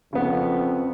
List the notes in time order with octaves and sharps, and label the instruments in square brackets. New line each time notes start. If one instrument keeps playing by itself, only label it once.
[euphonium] F2 [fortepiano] C#3 B3